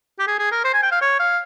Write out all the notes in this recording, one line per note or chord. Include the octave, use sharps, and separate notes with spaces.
G4
G#4
G#4
A#4
C5
G#5
G5
F5
C#5
F5